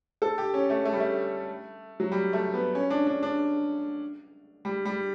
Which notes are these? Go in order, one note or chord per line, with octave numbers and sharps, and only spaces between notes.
A4
G4
C#4
A3
A3
G3
A3
F#3
G3
A3
B3
C#4
D4
D4
D4
G3
G3